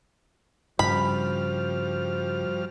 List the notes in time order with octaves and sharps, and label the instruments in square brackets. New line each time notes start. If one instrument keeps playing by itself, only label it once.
[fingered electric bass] G2 C#3 [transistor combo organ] F3 G3 F6 [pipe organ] F#4 C5 [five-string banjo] B5